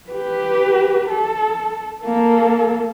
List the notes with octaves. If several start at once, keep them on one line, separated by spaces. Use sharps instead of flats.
G4 B4
A4
A#3 A4